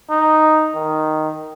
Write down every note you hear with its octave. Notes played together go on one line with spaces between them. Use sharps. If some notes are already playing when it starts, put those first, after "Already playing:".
D#4
D#3